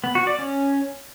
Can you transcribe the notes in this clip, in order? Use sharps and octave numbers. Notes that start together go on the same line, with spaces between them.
B3
F#4
D5
C#4